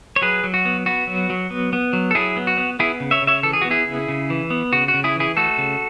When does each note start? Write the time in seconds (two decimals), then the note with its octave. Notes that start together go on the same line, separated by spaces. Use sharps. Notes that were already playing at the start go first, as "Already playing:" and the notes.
0.16 C#5
0.22 F#3 G#4 B4
0.44 F#3
0.54 F#4
0.65 B3
0.86 B3 F#4
1.07 F#3
1.30 F#3
1.51 B3
1.73 B3
1.93 F#3
2.11 A4
2.15 F#3 E4 G#4
2.37 B3
2.47 F#4
2.57 B3
2.79 B3 E4 G#4
3.00 C#3
3.11 C#5 E5
3.22 C#3
3.27 C#5 E5
3.43 E3 A4
3.53 G#4
3.62 B3 F#4
3.71 E4 G#4
3.86 C#3
4.08 C#3
4.30 E3
4.50 B3
4.73 C#3 F#4
4.88 F#4
4.94 C#3
5.04 E4 G#4
5.16 E3 E4 G#4
5.36 A3 F#4 A4
5.58 C#3